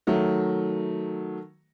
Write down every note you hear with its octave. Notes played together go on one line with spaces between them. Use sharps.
D#3 F#3 A3